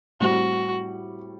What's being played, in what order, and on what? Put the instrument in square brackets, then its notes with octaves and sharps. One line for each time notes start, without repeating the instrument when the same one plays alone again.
[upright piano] A2 G3 C4 [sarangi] F#4